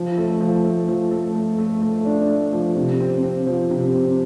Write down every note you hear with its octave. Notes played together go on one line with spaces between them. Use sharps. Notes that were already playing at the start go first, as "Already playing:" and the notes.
Already playing: F3
A3
F3
A3
F3
A3
A3
A3
A3
D4
A3
F3
C3
C4
C4
F3
C3
C4